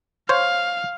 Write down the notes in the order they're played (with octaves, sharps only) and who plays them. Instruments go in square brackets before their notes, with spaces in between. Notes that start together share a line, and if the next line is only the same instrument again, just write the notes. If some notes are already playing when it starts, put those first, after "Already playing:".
[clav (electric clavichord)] C5 C#5 [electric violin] F5